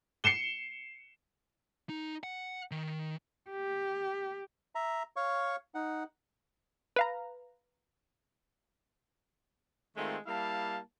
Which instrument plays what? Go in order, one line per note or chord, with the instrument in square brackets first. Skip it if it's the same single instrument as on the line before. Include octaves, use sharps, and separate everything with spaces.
[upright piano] C7 C#7 E7 G7
[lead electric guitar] D#4
F#5
D#3
[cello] G4
[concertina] E5 A#5
C#5 F5 C#6
D#4 F#5
[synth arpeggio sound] B4 F5 A#5
[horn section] D#3 G#3 A3 C4 F4
G3 A#3 E4 F5 A5